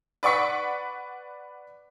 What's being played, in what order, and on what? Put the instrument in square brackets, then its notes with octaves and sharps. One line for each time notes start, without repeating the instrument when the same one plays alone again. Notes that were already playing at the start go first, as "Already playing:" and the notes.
[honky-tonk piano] B4 D5 F#5 C#6 B6